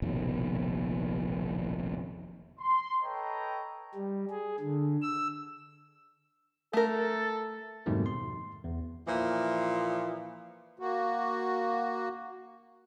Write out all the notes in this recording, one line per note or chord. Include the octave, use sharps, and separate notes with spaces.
F1 A#1 B2 D#3
C6
A4 B4 C#5 D#5 G5 A#5
G3
G#4
D3
E6
A3 A4 A#4
F2 G#2 B2 D#3 G3 A3
C6
E2
A#2 E3 F3
A#3 F#4